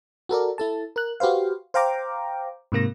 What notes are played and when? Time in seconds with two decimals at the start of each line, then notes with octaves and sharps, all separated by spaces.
0.29 F#4 A4 A#4 D5
0.58 E4 A4 A5
0.96 A#4 F#6
1.20 F#4 G4 B4 C5 F5
1.74 C5 F5 G5 A#5 D6
2.72 G#2 C3 A#3 A#6